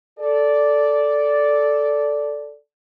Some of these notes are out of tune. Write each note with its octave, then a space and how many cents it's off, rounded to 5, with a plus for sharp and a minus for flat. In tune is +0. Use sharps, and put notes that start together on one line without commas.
A4 +0 D5 -5